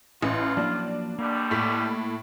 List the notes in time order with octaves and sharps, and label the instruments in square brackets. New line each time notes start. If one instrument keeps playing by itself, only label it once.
[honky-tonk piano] A1 [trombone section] A2 F4 [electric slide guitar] E4 D#5
[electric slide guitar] F3 F#3 A#3 [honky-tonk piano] D4
[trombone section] B2 D3 G3 [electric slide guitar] A#3
[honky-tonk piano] A2 B6